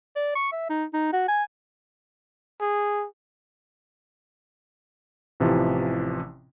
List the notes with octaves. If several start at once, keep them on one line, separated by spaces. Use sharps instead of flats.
D5
C#6
E5
D#4
D#4
F#4
G#5
G#4
A1 C3 E3 F3